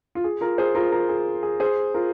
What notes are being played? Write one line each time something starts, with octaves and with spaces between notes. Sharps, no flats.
F4
G#4
F4 A#4
G#4 C5
F4 A#4
F4 A#4
G#4
G#4
G#4 C5
F4 A#4